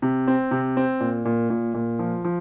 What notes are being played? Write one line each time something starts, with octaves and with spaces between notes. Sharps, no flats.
C3
C4
C3
C4
A#2
A#2
A#2
A#2
F3
F3